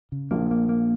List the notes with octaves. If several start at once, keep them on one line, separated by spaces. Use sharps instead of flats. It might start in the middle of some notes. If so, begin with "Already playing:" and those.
C#3
A#1 A#2 A#3
A#3
A#3